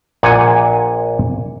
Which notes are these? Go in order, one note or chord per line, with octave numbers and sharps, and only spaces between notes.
A#1 A#2 F#5 G#5